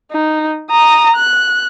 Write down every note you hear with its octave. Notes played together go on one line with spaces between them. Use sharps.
D#4
A#5 D#6
F#6